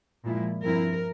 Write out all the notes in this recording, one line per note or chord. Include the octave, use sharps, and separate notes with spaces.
A#2 F3 G#3 E4
G2 F3 C4 E4 A#4